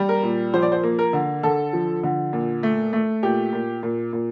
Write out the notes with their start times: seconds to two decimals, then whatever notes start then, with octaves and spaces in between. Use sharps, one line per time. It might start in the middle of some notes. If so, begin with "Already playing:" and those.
Already playing: G3
0.09 A#4
0.23 A#2
0.54 F3 C5
0.62 D5
0.72 C5
0.83 A#3
0.99 A#4
1.13 D3
1.43 D3 A4
1.73 F3
2.03 D3
2.33 A#2
2.63 A3
2.93 A3
3.23 A#2 G4
3.53 A#2
3.83 A#2
4.13 A#2